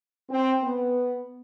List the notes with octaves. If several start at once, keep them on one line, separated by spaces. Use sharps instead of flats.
C4
B3